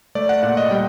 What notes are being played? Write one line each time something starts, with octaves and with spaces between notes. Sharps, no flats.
A3 D5
F#5
A#2 F#5
D#5
G3 G5